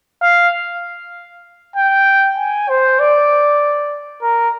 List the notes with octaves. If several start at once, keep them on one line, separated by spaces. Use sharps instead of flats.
F5
G5
G#5
C5
D5
A#4